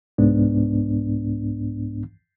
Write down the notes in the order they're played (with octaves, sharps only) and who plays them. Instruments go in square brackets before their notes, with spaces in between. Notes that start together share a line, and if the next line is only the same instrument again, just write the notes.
[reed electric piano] C2 G#2 B3 D4